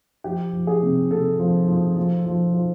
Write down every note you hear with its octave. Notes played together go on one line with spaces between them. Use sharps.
F3 G4
F3
G#4
C3
C3 A4
F3
F3
F3
F3
F3